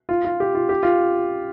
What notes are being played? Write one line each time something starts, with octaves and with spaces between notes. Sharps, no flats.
F4
F4
G4
F4
G4
F4